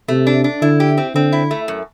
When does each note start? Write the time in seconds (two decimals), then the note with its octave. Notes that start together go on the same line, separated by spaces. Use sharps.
0.08 C3 A3
0.27 D4
0.44 D4
0.62 D3 E4
0.80 G4
0.98 C4
1.15 D3 C4
1.32 E4
1.51 A3
1.68 F#2